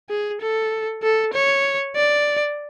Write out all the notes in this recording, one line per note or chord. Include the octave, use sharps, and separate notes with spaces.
G#4
A4
A4
C#5
D5